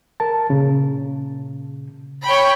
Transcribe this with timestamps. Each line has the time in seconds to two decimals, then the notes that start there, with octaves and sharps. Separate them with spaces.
0.20 A#4 A5
0.49 A#2 C#3
2.25 C#5 G5 B5